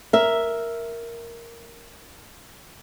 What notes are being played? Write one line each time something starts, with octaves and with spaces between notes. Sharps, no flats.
A#4 E5